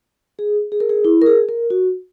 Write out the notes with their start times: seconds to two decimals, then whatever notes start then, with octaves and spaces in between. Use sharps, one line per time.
0.39 G#4
0.72 G#4
0.80 A#4
0.89 G#4
1.05 E4
1.22 A#4
1.26 G#4
1.49 A#4
1.70 F#4